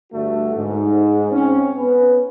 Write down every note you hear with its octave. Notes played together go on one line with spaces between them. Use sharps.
G2 D3 A3 D4 F#4
G#2
C4 C#4
B3 B4